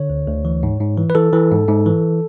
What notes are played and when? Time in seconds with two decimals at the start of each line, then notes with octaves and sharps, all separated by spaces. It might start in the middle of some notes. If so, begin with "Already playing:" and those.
Already playing: D3 C#5
0.10 D2
0.27 D2
0.45 E3
0.63 G#2
0.80 G#2
0.97 E3
1.10 B4
1.15 E3 A4
1.32 E3
1.51 G#2
1.68 G#2
1.86 E3